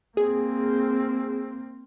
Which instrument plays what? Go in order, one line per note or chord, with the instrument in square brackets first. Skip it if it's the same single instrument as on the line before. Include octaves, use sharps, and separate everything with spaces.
[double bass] A#3 C4 [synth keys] G#4